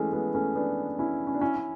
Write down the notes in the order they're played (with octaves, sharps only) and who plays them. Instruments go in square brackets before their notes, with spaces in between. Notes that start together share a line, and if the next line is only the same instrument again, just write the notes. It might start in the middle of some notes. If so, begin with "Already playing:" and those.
Already playing: [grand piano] E3 G#3 A3 C#4
G#3 B3
A3 C#4
B3 D4
C#4 E4
C#4
D4
C#4 E4
C#4